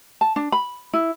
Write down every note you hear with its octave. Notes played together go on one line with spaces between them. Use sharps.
A5
D4
B5
E4